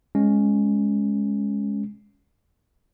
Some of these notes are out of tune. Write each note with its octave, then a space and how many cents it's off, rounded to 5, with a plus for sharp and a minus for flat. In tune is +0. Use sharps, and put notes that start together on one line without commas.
G#3 +0 C#4 +0